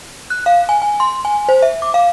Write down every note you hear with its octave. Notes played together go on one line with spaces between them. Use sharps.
F#6
F5
G#5
G#5
C6
G#5
C5
E5
D6
F5